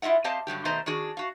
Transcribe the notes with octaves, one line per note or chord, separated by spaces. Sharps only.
E4 F4 D#5 E5 F#5
C4 G4 C5 D#5 F5 A5
G2 D3 F#3 G4
B2 D#3 A3 C5 D#5 A#5
D#3 D4 F#4 G#4
F#4 F5